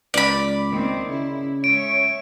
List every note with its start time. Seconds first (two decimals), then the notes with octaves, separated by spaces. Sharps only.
0.14 C#2 D5 B5
0.72 D#3 A#3 C4
1.10 C#3 E4
1.64 G#3 C#5 E5 D7